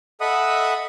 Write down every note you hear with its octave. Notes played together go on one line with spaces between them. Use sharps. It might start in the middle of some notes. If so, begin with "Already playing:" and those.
A4 D#5 E5 F#5 B5 D#6